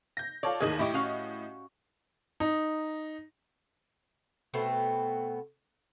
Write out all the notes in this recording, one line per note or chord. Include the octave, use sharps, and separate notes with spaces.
G6 A#6
F4 A4 C#5 D5
D#2 A2 D#3 G#4 D#5
A2 E4 G4 D#5 C#6
C#4 F#4 F5
D#4
B2 A3 B3 C4